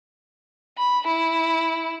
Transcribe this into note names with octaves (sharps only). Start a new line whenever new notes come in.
B5
E4